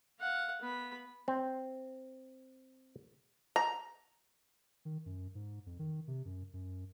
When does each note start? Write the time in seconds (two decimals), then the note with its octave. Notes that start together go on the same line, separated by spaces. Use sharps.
0.19 F5 F#5
0.61 B3 B5
1.28 C4
3.56 A#5
4.85 D#3
5.06 F#2
5.35 G#2
5.66 F2
5.79 D#3
6.08 C3
6.25 F#2
6.53 F#2